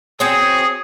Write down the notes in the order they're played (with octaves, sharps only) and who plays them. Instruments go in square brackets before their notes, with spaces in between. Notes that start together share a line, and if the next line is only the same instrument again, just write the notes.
[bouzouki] C4 F#4 C#5 [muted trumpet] G#4 [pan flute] D#6